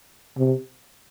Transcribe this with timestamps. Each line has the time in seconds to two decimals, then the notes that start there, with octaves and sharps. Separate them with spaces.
0.38 C3